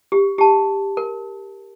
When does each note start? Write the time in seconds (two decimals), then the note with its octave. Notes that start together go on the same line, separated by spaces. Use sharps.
0.12 G4
0.38 G4 A5
0.97 A#4